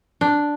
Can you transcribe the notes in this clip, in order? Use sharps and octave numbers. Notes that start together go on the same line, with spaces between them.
D4